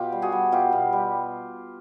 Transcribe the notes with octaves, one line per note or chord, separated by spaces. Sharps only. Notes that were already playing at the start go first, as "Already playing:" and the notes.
Already playing: B2 F4 G4
G3
F#4 G#4
G3
B2 F4 G4
B2
G3